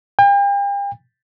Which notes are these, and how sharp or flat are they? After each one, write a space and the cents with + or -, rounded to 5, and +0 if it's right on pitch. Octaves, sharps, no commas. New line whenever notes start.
G5 +40